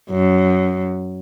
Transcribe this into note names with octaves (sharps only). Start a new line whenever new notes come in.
F#2